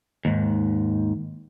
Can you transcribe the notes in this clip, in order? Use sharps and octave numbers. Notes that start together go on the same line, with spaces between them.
D#2 G#2